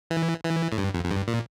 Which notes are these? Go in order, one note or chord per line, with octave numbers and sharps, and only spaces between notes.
E3
E3
A2
G2
F2
F2
G2
A#2